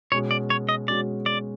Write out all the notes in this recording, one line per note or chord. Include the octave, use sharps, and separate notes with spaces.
B2 G#3 C#4 F#4 C#5
D5
C#5
D#5
B2 G#3 C#4 F#4 D5
D5